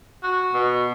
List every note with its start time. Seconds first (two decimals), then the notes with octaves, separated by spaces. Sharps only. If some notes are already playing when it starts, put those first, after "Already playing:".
0.23 F#4
0.54 B2